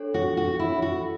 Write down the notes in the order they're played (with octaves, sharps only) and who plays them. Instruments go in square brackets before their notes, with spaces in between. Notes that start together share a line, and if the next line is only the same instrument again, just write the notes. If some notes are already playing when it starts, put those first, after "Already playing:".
Already playing: [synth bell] D4 A4 C#5
[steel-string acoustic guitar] F#4
F#4
E4
F#4